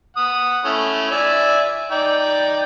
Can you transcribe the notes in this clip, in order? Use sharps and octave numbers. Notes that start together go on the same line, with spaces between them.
F#5 D#6
A3 C#4 E4
D5 E5 G#5
D#4 D5 G5